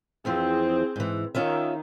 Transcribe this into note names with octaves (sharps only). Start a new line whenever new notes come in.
F2 E3 F3 C4 G#4
G#2 E3
D#3 C#4 F4 E5